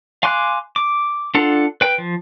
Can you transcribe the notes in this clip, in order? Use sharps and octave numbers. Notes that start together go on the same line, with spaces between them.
F5 G#5 C6 D6 F#6
D6
D4 F4 A4 F#5
B4 G5
F3